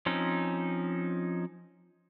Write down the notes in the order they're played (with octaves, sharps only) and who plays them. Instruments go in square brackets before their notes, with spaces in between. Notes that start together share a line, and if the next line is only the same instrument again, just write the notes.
[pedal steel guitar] F3 C4 C#4 D#4